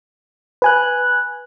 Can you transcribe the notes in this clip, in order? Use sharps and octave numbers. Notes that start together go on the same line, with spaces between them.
B4 G#5 F#6